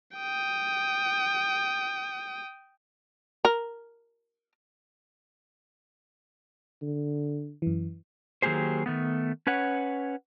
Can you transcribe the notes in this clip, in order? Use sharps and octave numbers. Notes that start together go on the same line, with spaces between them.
G5 D#6
A#4
D3
F#2 E3
D#3 F#3 A#3 G4 G#4 C5
D#3 A3 B3
C#4 B4 C#5 F#5